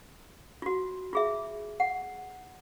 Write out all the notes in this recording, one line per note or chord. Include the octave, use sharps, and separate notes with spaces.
F4 F#4
F4 G#4 E5
F#5